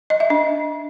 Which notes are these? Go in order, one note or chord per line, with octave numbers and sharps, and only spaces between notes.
D#5
E5
D4